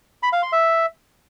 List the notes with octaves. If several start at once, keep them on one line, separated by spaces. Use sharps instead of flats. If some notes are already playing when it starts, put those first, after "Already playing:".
B5
F5
C6
E5